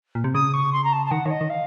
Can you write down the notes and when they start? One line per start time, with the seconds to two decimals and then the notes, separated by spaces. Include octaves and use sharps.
0.15 A#2
0.24 C3
0.34 C#3 D#6
0.53 C#6
0.72 C6
0.84 A#5
0.92 A5
1.05 A5
1.11 D#3 F#5
1.25 D#3 C#5
1.30 D#5
1.41 D#3
1.50 F5